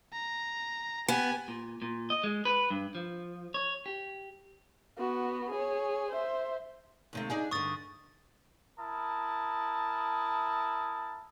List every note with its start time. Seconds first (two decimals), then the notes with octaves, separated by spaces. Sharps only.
0.13 A#5
1.08 B3 G4 G#5
1.48 A#2
1.82 A#2
2.10 D#5
2.24 G#3
2.45 B4
2.70 G2
2.95 F3
3.54 C#5
3.86 G4
4.98 B3 F#4
5.50 G#4 C#5
6.11 C5 E5
7.13 D#2 C3 A3
7.30 D4 D#4 G#4
7.51 G2 D3 C#6 D#6 A6
8.79 E4 A#4 A5 D#6